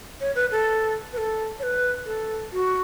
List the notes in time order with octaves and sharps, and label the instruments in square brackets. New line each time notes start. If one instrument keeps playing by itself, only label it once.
[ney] C#5
B4
A4
B4
A4
C#5
B4
A4
F#4